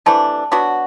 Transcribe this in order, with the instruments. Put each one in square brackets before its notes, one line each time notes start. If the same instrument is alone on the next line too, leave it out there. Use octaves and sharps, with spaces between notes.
[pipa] C3 E3 A3 D4 [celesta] A5
[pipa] F#3 B3 D4 F#4